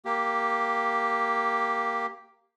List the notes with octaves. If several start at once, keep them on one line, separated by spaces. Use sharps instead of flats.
A#3 G4